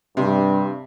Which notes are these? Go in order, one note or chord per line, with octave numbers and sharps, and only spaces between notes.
G2 C3